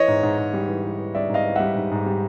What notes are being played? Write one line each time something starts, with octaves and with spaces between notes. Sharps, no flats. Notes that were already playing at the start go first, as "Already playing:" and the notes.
Already playing: E3 C#5 D#5
G#2
G#2
G#2
G3
E3
E3
E3
G3 D5 E5
G#2
D#5 F5
E3
G3 E5 F#5
G#2
G#2
G3